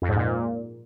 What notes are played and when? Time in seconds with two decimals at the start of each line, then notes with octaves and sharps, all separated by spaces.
0.02 F2
0.09 G#2
0.16 A#2